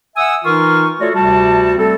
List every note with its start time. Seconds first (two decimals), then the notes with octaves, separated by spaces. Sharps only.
0.16 E5 F#5 G#5 D#6 E6
0.44 E3 D#4 F4 A#4 C#6 F6
1.00 A3 F4 F#4 A4 C#5 D5
1.14 D2 C3 G3 F#4 A5
1.77 G3 A3 C4 A4